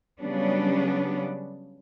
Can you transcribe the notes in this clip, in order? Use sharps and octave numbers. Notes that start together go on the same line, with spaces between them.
C#3 F#3 G3 B3 C#4 D4